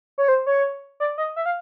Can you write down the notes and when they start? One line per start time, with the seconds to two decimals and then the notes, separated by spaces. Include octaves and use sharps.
0.18 C#5
0.28 C5
0.47 C#5
1.00 D5
1.18 D#5
1.36 E5
1.46 F5